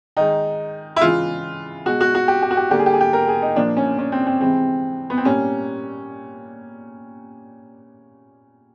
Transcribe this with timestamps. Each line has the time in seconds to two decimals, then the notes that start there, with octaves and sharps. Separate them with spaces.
0.17 D#3 G#3 D#4
0.96 E4
1.01 C#3 E3 G#3 F4
1.86 B2 G#3 F#4
2.01 F#4
2.15 F#4
2.28 G4
2.42 G4
2.51 F#4
2.57 G4
2.71 D3 G3 A#3 G4
2.79 G#4
2.86 G4
2.93 G#4
3.01 G4
3.13 A#4
3.28 G#4
3.42 D#4
3.56 A#2 F3 A#3 D4
3.77 C#4
3.99 C#4
4.12 C4
4.27 C4
4.40 C3 E3 G#3 C4
5.10 B3
5.18 C4
5.25 A#2 G3 A#3 C#4